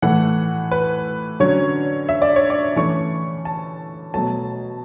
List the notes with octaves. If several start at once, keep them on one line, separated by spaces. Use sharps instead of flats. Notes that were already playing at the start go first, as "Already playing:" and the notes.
A2 E3 A3 F#5
B4
D3 F#3 C#4 C#5
E5
D5
C#5
D5
E3 A3 C#4 C#6
A5
B2 F#3 A3 A5